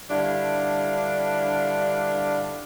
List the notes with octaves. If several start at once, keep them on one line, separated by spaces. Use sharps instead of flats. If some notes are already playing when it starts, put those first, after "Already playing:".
G2 D3 D4 E4 F5